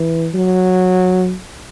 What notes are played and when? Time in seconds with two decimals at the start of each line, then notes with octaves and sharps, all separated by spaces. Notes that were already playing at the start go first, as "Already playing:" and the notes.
Already playing: E3
0.34 F#3